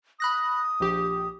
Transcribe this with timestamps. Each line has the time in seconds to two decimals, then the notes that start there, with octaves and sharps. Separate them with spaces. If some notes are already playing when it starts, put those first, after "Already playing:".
0.20 B5 D#6 F#6 A#6
0.80 A#1 G4